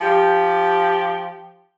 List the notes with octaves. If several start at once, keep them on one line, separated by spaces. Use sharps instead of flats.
F3 G4